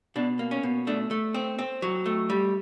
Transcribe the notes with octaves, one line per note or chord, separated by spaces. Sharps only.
B2 D4
A#3
C#4
B2
A3 D4
A3
C4
C4
F#3
A3
G3